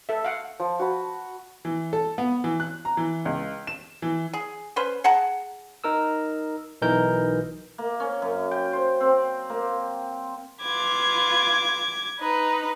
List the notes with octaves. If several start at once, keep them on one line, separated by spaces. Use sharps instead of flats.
A4 E5
F5 F#5
F3
F#4 A5 B5
E3
A4
B3
E3
F#6
A#5
E3
C#2
E7
E3
G#4
C#4 B4 C5
G#4 F#5 A5 A#5
D#4 A#4 E6
B1 E3 D#4 A#4 G6
A#3
C#4
F#2
G5
C5
C4
A#3
F4 B4 D6 G#6
D#4 B4